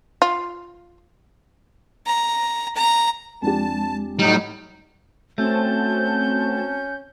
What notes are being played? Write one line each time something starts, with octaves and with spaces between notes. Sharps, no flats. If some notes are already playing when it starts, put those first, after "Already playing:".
F4
A#5
A#5
F2 G#3 D4 G4 A5
A2 F#3 G3 A3 D#4 E4
A3 C4 C#4 F#4 A5 G6